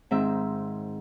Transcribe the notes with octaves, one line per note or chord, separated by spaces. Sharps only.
G#2 D#3 C4 E5